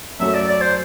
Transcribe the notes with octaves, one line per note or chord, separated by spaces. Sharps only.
F#2 F#3 A3 E5
D5
D5
C5